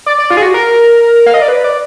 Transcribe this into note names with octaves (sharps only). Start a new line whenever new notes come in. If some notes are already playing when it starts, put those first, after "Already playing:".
D5
D5
F4
G#4
F#4
A#4
F5
D#5
D5
B4
D5